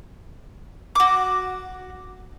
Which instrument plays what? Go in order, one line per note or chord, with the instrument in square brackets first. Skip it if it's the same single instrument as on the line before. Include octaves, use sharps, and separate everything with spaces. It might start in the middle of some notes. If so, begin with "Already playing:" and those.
[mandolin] F#4 D6